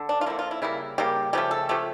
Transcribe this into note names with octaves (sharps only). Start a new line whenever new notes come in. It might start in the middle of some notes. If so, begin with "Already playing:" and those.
Already playing: D3
D4
F4
D3 F3 A#3 E4
F4
E4
C#3 G3 A#3 E4
C#3 G3 A#3 G4
C#3 F3 A3 G4
A4
C#3 F3 A3 G4